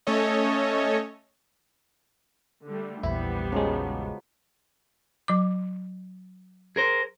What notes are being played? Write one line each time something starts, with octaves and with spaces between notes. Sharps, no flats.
A3 C#4 A4 C#5 D#5
D3 G3 A3
A#1 E2 G3 B3 E4 G4 C5 B5
C#3 F3 F#3 G#3
F#3 D6
G#4 A#4 C5